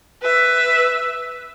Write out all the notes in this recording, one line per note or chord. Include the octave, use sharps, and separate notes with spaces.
B4 E5